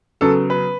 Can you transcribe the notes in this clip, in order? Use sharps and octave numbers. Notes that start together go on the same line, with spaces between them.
C#3 F#3 B3 A4
B4